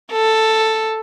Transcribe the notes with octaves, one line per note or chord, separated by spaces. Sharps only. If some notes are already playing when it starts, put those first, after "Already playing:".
A4